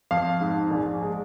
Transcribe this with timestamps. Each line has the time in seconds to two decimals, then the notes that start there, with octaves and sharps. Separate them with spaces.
0.11 F2 F5
0.41 G#2
0.71 A#1
1.02 G#3